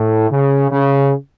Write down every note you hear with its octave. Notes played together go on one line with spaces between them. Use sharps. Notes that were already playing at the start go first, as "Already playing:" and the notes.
Already playing: A2
C#3
C#3